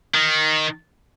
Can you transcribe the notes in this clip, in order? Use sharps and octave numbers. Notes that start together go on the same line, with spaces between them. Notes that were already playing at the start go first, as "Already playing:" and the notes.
D#3